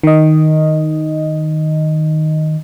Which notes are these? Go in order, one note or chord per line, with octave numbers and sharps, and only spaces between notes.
D#3 D#5